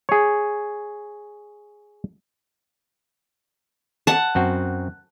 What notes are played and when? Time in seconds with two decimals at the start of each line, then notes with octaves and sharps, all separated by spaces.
0.09 G#4 C#5
4.07 F#5 A5
4.35 F#2 C4 F#4